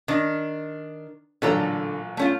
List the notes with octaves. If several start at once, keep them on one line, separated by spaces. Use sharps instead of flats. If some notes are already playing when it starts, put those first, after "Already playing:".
D#3 D4
A1 A#2 D3 F#3 A4 A#5
A3 C#4 F4